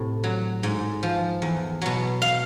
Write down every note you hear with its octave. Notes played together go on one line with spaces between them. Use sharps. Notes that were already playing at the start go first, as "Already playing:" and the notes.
Already playing: A2 C3
F#3
G#2
F3
E2
B2 F#3
F5